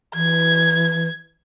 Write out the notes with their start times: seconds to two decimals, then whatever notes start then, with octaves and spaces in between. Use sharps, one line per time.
0.14 E3 G#6